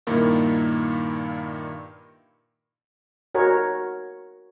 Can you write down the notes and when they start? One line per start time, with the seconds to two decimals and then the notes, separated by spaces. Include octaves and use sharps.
0.07 G2 A#2 D#3 A#3 E4
3.35 F#4 A#4 C#5